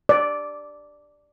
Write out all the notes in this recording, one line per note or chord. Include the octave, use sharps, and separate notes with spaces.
D5